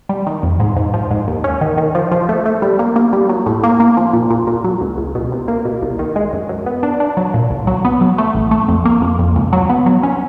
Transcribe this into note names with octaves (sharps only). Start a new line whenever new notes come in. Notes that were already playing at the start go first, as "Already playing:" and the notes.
G3
D#3
F2
G#2
G#2
F3
G#2
D#2
C#4
D#3
D#3
F3
F3
A3
A3
G3
A#3
A#3
G3
F#3
A2
A#3
A#3
F3
A#2
A#2
A#2
F#3
C#2
C#2
B2
C2
A#3
B2
C2
D#3
G#3
F#2
F#2
B3
D4
D4
F#3
A#2
C2
F#3
B3
F#3
A3
A1
A3
F2
A#3
F2
F2
C#2
F#3
B3
F#3
C#4